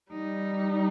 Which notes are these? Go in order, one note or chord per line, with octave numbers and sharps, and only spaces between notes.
G3 D#4